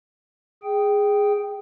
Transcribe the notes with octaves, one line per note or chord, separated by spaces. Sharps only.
G#4 G5